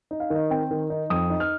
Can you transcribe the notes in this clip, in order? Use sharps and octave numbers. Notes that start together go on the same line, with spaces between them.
D#4
F5
D#3
D#5
C4 G5
D#3
D#4
F2 D#6
D#4
F6